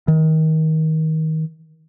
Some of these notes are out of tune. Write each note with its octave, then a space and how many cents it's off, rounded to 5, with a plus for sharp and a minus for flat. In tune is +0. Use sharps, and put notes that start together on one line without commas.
D#3 +25